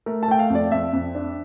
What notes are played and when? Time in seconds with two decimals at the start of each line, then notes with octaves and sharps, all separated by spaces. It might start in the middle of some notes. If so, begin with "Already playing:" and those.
0.06 A3 A#4
0.23 A5
0.28 A3 G5
0.39 F5
0.50 F2 D5
0.71 F2 E5
0.93 F2
1.15 D4